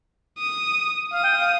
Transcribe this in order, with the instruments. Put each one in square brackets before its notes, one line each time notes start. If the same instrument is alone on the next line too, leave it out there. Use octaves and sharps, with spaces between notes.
[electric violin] D#6
[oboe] F5 [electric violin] D#6
[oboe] G5
F5